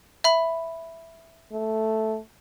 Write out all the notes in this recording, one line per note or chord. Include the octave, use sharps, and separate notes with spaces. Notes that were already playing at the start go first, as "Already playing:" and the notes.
E5 B5
A3